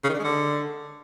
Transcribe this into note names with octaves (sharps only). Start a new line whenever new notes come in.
C#3
D#3
D4
G#3
D3